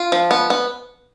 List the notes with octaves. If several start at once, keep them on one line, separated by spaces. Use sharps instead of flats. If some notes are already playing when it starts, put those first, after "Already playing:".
Already playing: F4
F3
B3
B3